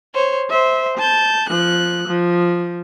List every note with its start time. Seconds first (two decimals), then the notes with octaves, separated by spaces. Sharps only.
0.14 C5 C#5
0.49 C5 E5
0.97 A5 G6
1.49 F3 F#6
2.07 F3